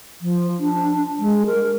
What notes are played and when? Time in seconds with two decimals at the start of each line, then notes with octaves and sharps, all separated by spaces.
0.21 F3
0.59 D4
1.19 G#3
1.47 A#4